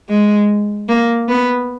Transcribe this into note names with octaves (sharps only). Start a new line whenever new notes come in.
G#3
A#3
B3